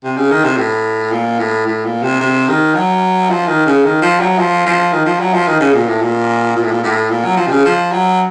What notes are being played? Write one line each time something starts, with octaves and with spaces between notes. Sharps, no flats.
C3
C#3
D#3
C3
A2
A#2
A2
A2
A#2
C3
C3
D#3
F#3
F3
D#3
C#3
D#3
F3
F#3
F3
F3
D#3
F3
F#3
F3
D#3
C#3
A#2
A2
A#2
A#2
A2
A#2
A2
A#2
F#3
F3
C3
C#3
F3
F#3